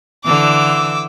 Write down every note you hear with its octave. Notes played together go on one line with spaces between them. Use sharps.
D3 E3 D6 E6